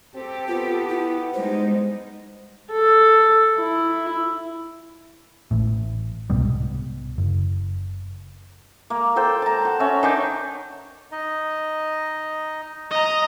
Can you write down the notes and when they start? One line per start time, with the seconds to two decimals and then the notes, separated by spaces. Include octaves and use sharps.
0.15 C4 G4 A4
0.48 B3 F4
0.89 E4
1.34 G3 G#3 D#4 C5
2.72 A4
3.57 E4
5.51 A1 A2
6.30 C2 G#2 B2 G3
7.18 F#1
8.90 A#3
9.16 A4 C5 G5
9.42 A5 A#5
9.65 F#4
9.80 C#4 E5
10.03 D#3 C#4 D4 G5
11.12 D#4 D#5
12.90 D#5 A#5